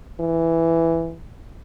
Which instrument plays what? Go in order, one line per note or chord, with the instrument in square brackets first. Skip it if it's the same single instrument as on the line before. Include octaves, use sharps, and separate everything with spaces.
[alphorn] E3